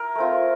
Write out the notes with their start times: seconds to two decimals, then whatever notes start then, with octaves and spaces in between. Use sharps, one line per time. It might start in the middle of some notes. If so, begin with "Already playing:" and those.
Already playing: E4 A#4
0.15 A3 C4 F4